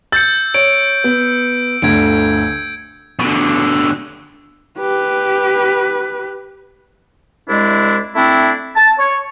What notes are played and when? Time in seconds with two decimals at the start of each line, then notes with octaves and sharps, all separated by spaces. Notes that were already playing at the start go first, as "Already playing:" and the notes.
0.12 E6 G6 A6 C#7
0.54 C#5 D7
1.04 B3
1.82 G1 D2 G#6 D7
3.20 B2 D3
4.79 G4 B4
7.49 C2 G#3 D4 E4
8.15 A3 C4 D4 E4
8.76 A5
8.99 C#5